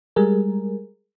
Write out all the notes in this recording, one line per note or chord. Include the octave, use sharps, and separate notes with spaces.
G3 G#3 G#4 A#4